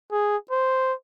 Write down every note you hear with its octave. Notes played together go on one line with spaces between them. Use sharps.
G#4
C5